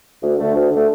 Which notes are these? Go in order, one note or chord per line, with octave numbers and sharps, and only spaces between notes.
D2
D3 A3
D2
D3 A3